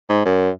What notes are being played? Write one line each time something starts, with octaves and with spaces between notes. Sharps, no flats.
G#2
F#2